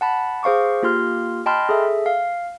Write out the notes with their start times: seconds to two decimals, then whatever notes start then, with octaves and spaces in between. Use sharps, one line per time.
0.01 F#5 A5 B5
0.43 G#4 C5 F5 C#6 D6
0.83 A#3 F4 G4 C6 F6
1.46 D#5 G5 A5 B5 C6 F6
1.69 G#4 A4 E5
2.06 F5